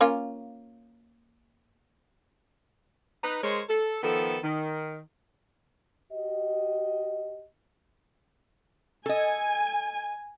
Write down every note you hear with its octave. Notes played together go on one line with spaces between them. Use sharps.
A#3 C#4 F4
D#4 B4
G#3 A#4 C5 C#5
A4
D#3 F3 B3 A4
D#3
F#4 G4 D#5
A4 D#5 G#5